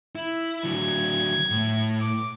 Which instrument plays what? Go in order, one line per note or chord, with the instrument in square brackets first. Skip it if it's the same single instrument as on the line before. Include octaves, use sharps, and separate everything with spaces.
[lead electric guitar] E4
[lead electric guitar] D3 F#3 [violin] G#6
[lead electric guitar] A2
[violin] D6